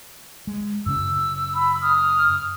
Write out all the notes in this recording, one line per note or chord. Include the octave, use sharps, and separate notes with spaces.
G#3
F#2 C#3 C#4 E6
B5
D#6 F6